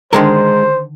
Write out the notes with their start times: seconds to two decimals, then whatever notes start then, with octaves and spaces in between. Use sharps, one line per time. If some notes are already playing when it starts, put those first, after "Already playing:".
0.13 D3 D#3 G#3 A#4 C5 A5